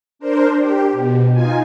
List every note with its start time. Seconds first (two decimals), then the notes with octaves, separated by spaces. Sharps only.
0.19 D4 A#4 C5
0.58 G4
0.91 B2
1.33 D#4 F4 G#5